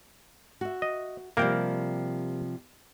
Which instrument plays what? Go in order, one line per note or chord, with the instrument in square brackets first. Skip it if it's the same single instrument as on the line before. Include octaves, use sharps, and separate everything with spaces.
[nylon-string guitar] F#4 E5
[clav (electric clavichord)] D#5
[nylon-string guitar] C3 F3 G3 [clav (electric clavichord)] A#3 A#4 G5